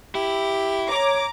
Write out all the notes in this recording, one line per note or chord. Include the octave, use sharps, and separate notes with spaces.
E4 G4
C#5 A#5 D6